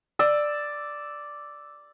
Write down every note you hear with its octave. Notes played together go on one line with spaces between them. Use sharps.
D5 E6